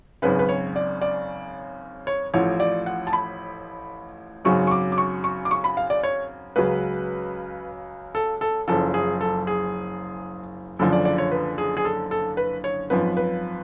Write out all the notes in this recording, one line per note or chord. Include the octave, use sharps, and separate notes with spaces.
G#1 F#2 C#3 B4
B4
C#5
D5
D5
C#5
A1 A2 F3 C#5
D5
F#5
A5
B5
G#1 F#2 C#3 F#3 C#6
C#6
D6
D6
C#6
C#6
D6
C#6
B5
F5
D5
C#5
C#2 C#3 F#3 B4
A4
A4
F#1 F#2 F3 A4
G#4
A4
G#4
F#1 F#2 D3 F3 A4
D5
D5
C#5
B4
G#4
G#4
A4
A4
B4
C#5
G#1 F#2 F3 B4
B4